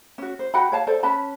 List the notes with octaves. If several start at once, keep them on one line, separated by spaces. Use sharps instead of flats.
C#4 F#4
C5
F#4 F#5 G5 B5
C#5 F5 A5
A4 C5 D5
C#4 B4 A5 B5